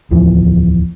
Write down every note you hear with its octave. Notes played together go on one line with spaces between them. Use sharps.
D1 E2 E3 F3